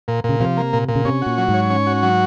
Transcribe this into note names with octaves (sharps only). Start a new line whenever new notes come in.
A#2
A#2 C#3
C3 F3
A#3
A#2
A#2
C#3
C3 C#4
A#2 F#4
F#3
G#2
C#5
C#4
F#4
F#3